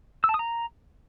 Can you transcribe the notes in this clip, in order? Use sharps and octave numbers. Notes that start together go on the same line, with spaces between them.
E6
A5
D#6
A#5